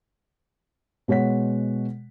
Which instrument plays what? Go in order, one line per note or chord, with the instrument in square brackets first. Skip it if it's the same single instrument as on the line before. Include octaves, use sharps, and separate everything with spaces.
[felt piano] B2 G#3 C#5 F#5 B6